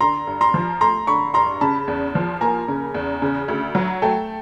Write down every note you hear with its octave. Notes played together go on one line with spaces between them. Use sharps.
D3 A#5 C6
G2
A#5 C6
F3
A3 A#5 C6
D3 B5 C#6
G2 A#5 C6
C#3 A5 B5
E2
F3
A#3 G#5 A#5
C#3
E2
C#3
D2
F#3
A3 G5 A5